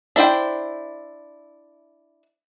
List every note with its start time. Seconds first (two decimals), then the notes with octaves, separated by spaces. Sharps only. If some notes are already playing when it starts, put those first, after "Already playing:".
0.16 D4 E4 C5 G5